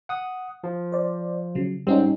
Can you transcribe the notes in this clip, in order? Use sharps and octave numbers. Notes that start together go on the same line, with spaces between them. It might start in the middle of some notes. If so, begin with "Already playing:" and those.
F#5 D#6
F3
C5 D5
C#3 F#3
G#2 G3 C4 C#4 D#4